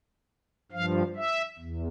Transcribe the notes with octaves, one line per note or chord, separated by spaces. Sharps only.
G2 F3 F5
E5
E2